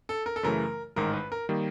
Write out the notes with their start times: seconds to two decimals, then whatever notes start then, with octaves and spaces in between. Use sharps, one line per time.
0.09 A4
0.26 A#4
0.36 A4
0.43 F#2 C#3 E3 A3 A#4
0.96 A1 G#2 D#3 G#3 A#4
1.14 B4
1.32 A#4
1.49 D#3 G3 A#3